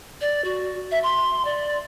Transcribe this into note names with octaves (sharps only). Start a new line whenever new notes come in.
D5
F#4
E5
C6
D5